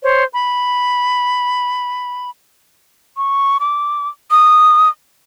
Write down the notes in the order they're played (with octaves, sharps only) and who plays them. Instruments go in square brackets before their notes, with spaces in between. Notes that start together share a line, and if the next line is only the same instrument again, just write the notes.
[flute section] C5 C#5
B5
[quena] C#6
D6
D#6